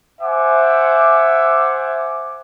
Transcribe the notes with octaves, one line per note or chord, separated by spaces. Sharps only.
C5 E5 F#5 G#5 D6